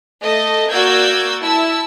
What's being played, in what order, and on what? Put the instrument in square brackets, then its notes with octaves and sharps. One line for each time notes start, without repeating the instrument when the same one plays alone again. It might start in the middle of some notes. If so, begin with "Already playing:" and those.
[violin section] A3 D#5 A5
A#3 F#4 D5 E6 G6 G#6
E4 A5 E6